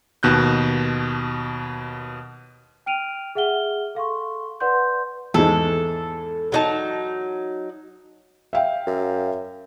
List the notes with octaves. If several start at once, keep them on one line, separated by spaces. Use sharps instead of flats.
D#2 B2 F#6 G6
G5 F6 D7 D#7 F7
G#4 E5 F#5 F6 G7
A4 F5 C6 C#6
B4 D5 F#5 C6 G6
E2 G#2 G#3 A4
F#3 D#4 A5
E5 F5 G5
F#2